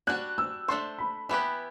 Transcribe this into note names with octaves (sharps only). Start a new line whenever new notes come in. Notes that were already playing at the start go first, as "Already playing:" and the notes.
G3 D4 F#4 F#6
E6
A3 D4 A4 C5 C6
B5
E3 B3 E4 G4 B4 B5